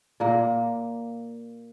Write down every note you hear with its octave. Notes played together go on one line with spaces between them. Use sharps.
A#2 A#3